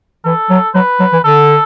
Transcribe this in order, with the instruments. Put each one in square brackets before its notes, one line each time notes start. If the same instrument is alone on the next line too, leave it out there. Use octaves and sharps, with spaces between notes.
[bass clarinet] E3 [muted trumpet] A4
[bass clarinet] F#3
[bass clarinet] F#3 [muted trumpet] B4
[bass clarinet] F#3
E3
[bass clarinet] D3 [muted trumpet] A4